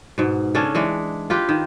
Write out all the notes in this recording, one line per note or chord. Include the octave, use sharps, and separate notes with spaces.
G#2 B2
C#3 C#4 D4 A4
E3 G#3 D4
F4 G4 B4
D#3